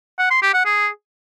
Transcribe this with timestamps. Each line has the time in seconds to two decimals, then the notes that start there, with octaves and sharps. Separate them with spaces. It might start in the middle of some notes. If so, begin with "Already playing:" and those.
0.19 F#5
0.30 C6
0.42 G4
0.54 F#5
0.65 G#4